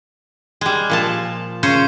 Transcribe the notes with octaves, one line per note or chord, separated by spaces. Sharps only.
G3 G#3
A#2 F3 A5
C#3 C#4 C5